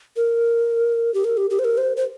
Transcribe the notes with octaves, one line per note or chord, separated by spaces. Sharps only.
A#4
G4
A#4
G4
G4
C5
A#4
C5
C5